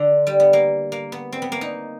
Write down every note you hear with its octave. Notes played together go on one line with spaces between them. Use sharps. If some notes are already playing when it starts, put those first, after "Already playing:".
Already playing: D3
G3
B3
A#3
A#3
B3
C4
B3
A#3
D#4